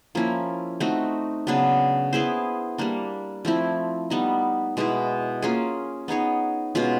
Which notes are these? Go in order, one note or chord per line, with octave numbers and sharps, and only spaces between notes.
F3 A#3 C#4 E4
A3 C4 D#4 F#4
C#3 F#3 B3 D4
B3 E4 G#4 C5
G3 A#3 D4
F3 A3 C4 E4
G3 B3 D#4
B2 G#3 B3 E4
A#3 C#4 F4 G#4
B3 D#4 G#4 C#5
B2 G#3 C#4 F4